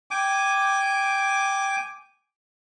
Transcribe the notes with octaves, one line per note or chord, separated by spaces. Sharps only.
G5 G#5 D6